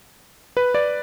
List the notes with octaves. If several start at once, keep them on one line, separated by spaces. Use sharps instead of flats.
B4
D5